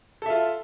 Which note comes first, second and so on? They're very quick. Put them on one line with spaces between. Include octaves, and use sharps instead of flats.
A4 E5 F4